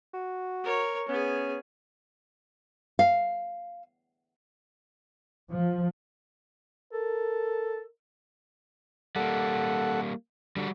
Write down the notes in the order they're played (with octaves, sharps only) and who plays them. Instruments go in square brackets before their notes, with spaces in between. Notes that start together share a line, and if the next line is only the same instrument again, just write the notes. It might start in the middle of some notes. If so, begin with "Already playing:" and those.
[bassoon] F#4
[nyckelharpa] A#4 C#5
[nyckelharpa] B3 G#4 [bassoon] C#4
[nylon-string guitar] F5
[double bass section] F3
[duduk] A4 [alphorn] A#4
[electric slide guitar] G3 A#3 [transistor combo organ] A4 F#5
[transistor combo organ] D3 [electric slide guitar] G3 F#4